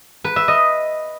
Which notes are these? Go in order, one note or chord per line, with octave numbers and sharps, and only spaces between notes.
B4
E5
D#5